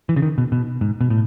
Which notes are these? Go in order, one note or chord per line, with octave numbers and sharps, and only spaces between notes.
E3
C#3
D#3
B2
B2
G#2
B2
A2